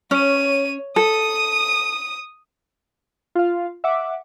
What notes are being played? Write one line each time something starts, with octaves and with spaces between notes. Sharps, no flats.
C#4 C#5 D#7
A4 D#6 D#7
F4 F5
E5 F#5 D6